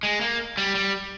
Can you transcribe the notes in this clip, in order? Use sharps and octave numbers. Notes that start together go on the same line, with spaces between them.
G#3
A#3
G3
G3